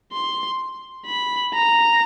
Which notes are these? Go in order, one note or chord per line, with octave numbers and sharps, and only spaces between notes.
C6
B5
A#5